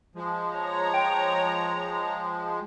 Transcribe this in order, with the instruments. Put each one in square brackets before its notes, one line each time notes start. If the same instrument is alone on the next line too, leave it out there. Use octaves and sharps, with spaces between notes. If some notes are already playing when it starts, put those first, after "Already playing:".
[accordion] F3 G#3
[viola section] C#5 A#5
[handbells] G5